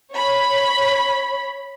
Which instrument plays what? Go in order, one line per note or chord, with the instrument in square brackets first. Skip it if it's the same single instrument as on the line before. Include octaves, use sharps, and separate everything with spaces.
[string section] C#5 B5